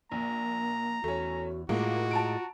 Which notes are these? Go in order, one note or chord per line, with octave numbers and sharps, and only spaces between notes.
A#1 A#3 A#5
E2 A3 C#4 F#4
A2 G#3 A#3 F4 F#4
A5 A#5 D7